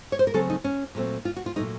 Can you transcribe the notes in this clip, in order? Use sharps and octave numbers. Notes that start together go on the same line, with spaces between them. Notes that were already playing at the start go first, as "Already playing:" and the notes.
C#5
C5
A#4
C#3 F#3 A3 C4 A4
D#4
C#4
A#2 F#3 A3 C4
F4
F#4
F4
A#2 F#3 A3 D#4